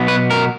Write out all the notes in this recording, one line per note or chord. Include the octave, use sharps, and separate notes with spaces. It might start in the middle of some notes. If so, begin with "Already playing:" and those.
Already playing: B2 F#3 B3
B4
A#4